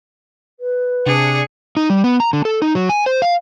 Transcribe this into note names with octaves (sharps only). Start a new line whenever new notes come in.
B4
C3 D4 G#4 C#7
D#4
G3
B3
A#5
D3
A4
D#4
F#3
G#5
C5
F5